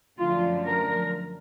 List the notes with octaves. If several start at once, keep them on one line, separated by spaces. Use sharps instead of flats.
F#2 D3 F3 A3 F4
A#4